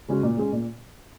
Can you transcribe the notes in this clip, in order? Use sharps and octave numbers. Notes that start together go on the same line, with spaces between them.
C#3 G#3 C#4 F#4
A#2
G#3 C#4 G#4
A#2